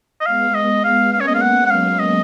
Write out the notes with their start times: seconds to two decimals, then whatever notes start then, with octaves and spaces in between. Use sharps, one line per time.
0.21 D#5
0.26 G#3 B3 F5
0.55 D#5
0.84 F5
1.13 A#3 C#4 F5
1.20 C#5
1.27 D#5
1.35 F5
1.42 G#3 B3 F#5
1.66 F#5
1.70 F#3 A#3 F5
1.99 D#5